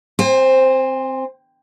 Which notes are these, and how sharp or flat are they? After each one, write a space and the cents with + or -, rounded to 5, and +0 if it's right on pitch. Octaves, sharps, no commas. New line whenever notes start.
C4 +0 C5 +5 G#5 -45